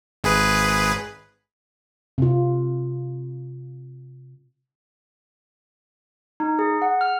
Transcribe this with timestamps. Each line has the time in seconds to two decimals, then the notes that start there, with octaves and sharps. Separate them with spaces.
0.24 G#1 G#4 B4
2.18 C3 F4
6.40 D#4
6.59 G#4
6.82 F#5
7.01 F6